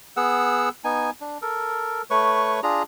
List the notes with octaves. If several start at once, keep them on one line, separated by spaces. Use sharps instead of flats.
B3 G#4 F#5 E6
B3 D#4 G#5
D4
A4 A#4
A3 B4 C#5 C#6
D4 F4 G#4 A#5